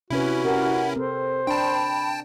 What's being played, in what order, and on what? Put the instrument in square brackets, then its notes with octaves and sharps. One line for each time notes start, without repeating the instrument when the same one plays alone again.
[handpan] C3 B4 [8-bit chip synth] C#4 E4 [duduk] F#4
[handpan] G4 A#4 [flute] F#5
[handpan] C4 [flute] A4 [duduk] C5
[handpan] D4 [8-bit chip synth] G5 A5 [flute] B5